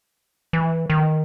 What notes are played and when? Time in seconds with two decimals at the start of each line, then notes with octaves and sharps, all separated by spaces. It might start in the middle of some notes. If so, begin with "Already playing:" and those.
0.53 E3
0.90 D#3